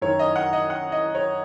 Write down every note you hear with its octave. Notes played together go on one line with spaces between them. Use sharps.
F#2 D#3 C#5
D#5
F#5
D#5
F#5
D#5
C#5